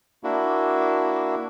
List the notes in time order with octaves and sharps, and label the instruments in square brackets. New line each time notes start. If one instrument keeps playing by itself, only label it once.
[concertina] A#3 D4 E4 F#4